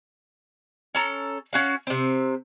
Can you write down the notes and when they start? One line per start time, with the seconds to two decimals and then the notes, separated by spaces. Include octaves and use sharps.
0.95 C#4 A4 A#5
1.53 C#4 F#4 F5
1.87 C3 C4